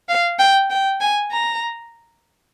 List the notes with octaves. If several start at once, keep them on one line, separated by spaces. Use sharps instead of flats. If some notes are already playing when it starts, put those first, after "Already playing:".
F5
G5
G5
G#5
A#5